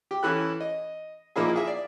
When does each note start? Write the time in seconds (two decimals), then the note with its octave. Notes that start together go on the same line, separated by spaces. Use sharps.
0.11 G4
0.23 E3 C#4 E4 A4 F#6
0.60 D#5
1.36 A#2 F3 A#3 D#4 E4 G#4
1.56 G#4 E5
1.67 D5